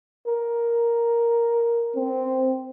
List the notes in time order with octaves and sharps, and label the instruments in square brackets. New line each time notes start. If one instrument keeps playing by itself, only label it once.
[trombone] A#4
[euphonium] C4